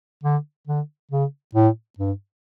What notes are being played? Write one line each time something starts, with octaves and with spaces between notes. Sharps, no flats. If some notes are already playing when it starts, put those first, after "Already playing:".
D3
D3
C#3
A2
G2